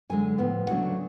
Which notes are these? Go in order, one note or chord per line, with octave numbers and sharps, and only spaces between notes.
F#2 D3 G#3 G#5
A2 F3 B3
D2 C#3 F#3 A3 D4 F#5